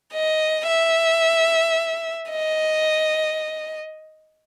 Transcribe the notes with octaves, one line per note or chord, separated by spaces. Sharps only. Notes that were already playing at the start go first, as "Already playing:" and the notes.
D#5
E5
D#5